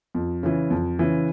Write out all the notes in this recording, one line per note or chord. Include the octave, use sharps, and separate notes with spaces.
F2
C#3 E3
F2
C#3 E3